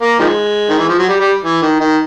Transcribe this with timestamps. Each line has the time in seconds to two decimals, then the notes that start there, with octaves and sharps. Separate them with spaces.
0.02 A#3
0.19 D#3 F3 G#3
0.69 D#3
0.79 E3
0.89 F3
0.99 F#3
1.09 G3
1.21 G3
1.44 E3
1.62 D#3
1.81 D#3